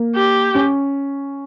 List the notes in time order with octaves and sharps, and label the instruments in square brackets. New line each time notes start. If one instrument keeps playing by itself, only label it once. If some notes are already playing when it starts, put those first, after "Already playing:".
Already playing: [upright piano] A#3
[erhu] G4
[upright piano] C#4